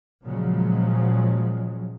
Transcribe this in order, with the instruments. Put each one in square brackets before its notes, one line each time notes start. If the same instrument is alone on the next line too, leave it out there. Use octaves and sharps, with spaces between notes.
[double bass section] A#2 C#3 F3 F#3 G#3